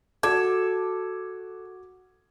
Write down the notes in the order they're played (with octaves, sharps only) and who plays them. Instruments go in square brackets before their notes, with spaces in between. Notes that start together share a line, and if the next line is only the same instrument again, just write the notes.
[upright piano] F#4 D6 G#6 [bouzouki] A4